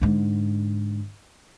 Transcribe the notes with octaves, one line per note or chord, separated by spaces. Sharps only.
G#2 D3